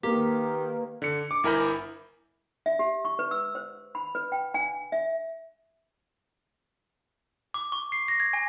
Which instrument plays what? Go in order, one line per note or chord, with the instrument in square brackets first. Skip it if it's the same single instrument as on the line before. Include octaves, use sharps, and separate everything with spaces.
[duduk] D#3 [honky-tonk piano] A#3 [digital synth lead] G4 [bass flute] B4
[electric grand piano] D3 C#7
D6
G1 E4 A#4 G#5 B5 G6
[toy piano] E5
G4
C#6
B4
E6
C5
B5
B4
G5
G#5
E5
[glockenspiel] D6
C#6
C7
A#6
G#6
G#5